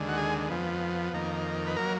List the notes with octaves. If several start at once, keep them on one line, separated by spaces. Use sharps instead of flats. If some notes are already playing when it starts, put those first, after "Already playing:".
Already playing: D#2 D3 G#3
F#4
G#4
F2 F3 B3
F2 D#3 A#3
B4
F#3 A#3 A#4